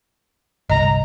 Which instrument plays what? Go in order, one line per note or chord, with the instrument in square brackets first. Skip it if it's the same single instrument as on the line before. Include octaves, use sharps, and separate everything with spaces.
[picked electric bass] G1 C2 [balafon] D#5 [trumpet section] A#5